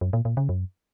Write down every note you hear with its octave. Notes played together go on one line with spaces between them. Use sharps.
F#2
A#2
A#2
C#3
F#2